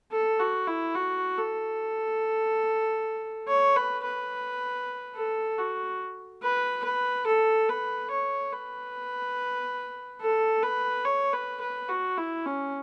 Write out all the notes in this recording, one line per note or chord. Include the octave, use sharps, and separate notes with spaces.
A4
F#4
E4
F#4
A4
C#5
B4
B4
A4
F#4
B4
B4
A4
B4
C#5
B4
A4
B4
C#5
B4
B4
F#4
E4
C#4